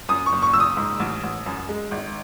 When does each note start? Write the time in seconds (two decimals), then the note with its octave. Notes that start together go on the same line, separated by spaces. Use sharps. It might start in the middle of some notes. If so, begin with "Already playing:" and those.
0.09 F#2 D#6
0.26 C#6
0.32 F#1
0.43 C#6
0.53 F#1 E6
0.60 D#6
0.77 G#2
1.00 A1
1.23 A1
1.46 F#2
1.69 G#3
1.91 G#1